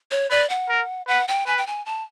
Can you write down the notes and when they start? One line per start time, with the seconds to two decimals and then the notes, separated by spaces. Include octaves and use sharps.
0.11 C#5
0.30 B4 D5
0.50 F#5
0.69 A#4
1.08 B4 F#5
1.28 G5
1.47 B4 G#5
1.58 G5
1.67 G#5
1.86 A5